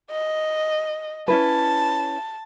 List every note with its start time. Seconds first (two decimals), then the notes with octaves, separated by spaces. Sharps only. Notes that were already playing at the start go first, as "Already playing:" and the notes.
0.11 D#5
1.28 C#4 E4 B4 A5